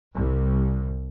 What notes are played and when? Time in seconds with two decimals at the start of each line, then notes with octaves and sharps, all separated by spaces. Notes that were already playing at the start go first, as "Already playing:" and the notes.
0.17 C2